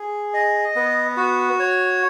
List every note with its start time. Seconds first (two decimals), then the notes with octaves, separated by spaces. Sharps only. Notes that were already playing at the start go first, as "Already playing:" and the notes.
Already playing: G#4
0.34 D#5
0.76 B3
1.17 F#4
1.60 C#5